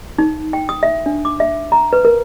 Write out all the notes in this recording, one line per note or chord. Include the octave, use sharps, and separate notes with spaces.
D#4
G5
D#6
E5
D4
D6
E5
A#5
B4
A#4